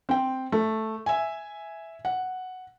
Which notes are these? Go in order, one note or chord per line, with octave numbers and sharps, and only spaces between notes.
C4 G5
A3
E5 G#5
F#5